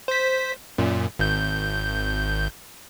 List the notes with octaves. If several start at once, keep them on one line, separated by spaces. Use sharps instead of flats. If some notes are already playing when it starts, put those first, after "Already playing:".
C5 B6
F#2 A#2
G#1 G6